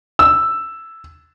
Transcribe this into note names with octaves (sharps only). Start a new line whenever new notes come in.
E6